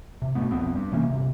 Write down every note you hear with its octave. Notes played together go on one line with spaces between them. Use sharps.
C3
G2 B2 A3 B3
B1 F2 B3 C4
G2
C3 E3 A#3 C#4
G1 E2 C3